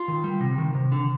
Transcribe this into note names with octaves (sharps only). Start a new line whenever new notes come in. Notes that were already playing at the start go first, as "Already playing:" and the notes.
Already playing: F4
D#3
G3
C3
D#3
C3
D3